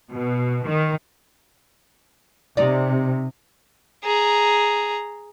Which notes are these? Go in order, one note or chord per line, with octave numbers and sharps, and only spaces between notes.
B2
D#3
C3 D#4 D5
G#4 A#5